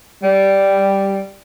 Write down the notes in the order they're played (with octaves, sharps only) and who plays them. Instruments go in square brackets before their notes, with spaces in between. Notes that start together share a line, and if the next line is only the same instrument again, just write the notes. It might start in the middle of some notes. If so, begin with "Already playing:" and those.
[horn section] G3